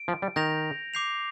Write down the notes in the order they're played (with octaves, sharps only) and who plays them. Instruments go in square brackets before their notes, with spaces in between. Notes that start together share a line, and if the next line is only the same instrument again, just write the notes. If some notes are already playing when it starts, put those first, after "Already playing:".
Already playing: [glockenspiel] D7
[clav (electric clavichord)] F3
G3
[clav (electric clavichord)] D#3 [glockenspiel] G6 A#6 F7
[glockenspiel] D6 G6 C7 F7